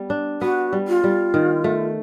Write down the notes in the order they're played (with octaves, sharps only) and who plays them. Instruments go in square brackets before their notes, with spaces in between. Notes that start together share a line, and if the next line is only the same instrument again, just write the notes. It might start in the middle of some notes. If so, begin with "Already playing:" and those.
Already playing: [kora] G3 B3
D4
[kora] B3 [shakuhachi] F#4
[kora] G3
[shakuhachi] F4
[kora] G3
D#3
A3